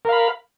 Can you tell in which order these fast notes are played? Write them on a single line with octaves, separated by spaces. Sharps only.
A#4 F5 B5